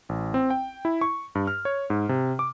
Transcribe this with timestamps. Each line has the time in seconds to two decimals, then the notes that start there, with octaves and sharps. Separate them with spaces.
0.09 A1
0.34 C4
0.50 G5
0.85 E4
1.01 C#6
1.35 G2
1.47 F6
1.65 C#5
1.90 G#2
2.09 C3
2.39 D6